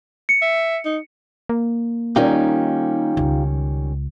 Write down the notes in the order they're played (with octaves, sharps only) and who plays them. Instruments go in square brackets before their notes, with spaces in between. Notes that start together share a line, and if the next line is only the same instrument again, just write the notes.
[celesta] C#7
[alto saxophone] E5
D#4
[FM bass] A#3
[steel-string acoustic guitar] D#3 G3 C#4 [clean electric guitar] D#4 F4 G4
[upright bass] C#2